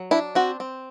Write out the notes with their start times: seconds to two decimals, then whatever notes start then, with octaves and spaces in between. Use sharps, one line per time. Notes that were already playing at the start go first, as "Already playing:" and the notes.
Already playing: F#3
0.11 D4 E4
0.35 C4 F#4
0.60 C4